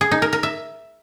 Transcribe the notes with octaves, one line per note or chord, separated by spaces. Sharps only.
G#4
D#4
A#4
A#4
E5